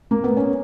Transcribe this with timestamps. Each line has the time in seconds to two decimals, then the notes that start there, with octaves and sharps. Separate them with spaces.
0.11 A#3
0.24 B3
0.37 C#4